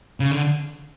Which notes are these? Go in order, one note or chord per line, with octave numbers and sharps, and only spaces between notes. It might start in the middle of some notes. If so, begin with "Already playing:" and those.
C#3
D3